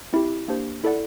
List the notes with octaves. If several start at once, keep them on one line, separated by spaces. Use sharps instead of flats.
C4 E4 G4
A#3 D4 G4 C5
E4 A4 D5 F#5